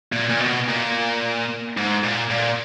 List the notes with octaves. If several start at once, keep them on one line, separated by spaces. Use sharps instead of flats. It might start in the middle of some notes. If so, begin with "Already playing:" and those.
A#2
A#2
B2
A#2
G#2
A#2
A#2